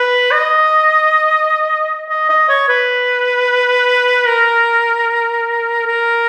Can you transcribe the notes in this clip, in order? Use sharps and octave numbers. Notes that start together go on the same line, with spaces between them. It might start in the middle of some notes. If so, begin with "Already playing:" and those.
Already playing: B4
D#5
D#5
D#5
C#5
B4
A#4
A#4